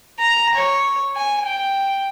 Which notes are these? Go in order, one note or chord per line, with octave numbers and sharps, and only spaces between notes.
A#5
C#5
G#5
G5